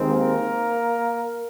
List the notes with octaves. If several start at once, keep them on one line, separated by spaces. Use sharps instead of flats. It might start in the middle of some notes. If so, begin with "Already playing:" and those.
Already playing: D#2 D#3 G#3 C4
A#3 A#4